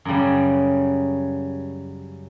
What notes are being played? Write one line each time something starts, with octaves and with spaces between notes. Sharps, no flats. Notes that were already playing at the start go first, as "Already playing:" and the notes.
F#2 C#3 G3